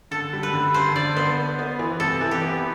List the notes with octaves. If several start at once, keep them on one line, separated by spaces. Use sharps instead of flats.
D3 A4
G3
B4
D3
G2 C5
D3 D5
B3 C5
B3
B3
E3
C3 A4
E3
G4
B3